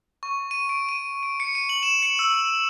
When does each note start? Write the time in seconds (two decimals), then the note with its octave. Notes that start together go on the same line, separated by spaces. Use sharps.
0.23 C#6
0.51 D#7
0.69 D7
0.89 D#7
1.23 D7
1.40 C#7
1.55 D#7
1.69 F#7
1.83 E7
2.03 C#7
2.19 E6